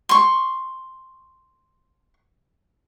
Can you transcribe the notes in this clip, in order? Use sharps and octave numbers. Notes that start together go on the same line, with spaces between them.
C6 C#6